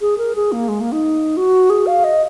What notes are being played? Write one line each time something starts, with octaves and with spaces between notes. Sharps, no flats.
G#4
A#4
G#4
A#3
G#3
A#3
D#4
F#4
G#4
F5
D#5